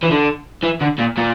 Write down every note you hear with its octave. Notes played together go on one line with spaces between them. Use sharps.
E3
D3
E3
D3
A#2
A#2